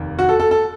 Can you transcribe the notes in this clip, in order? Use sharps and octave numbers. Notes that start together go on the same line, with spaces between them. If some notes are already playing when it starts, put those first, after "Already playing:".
Already playing: F1 D#2 D#3
F#4
A4
A4
A4